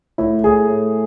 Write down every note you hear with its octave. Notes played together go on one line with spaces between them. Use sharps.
A2 E4
A2 G#4
A2